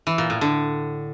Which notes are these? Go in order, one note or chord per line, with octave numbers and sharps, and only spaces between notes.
E3
A#2
A2
D3